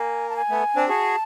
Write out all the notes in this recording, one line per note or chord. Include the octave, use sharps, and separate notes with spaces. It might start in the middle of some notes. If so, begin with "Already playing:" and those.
Already playing: A#3 G#5
A5
G#5
A3 B3
C4 D4
F#4 G#4 A5